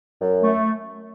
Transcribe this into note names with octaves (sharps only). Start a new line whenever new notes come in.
F#2
A3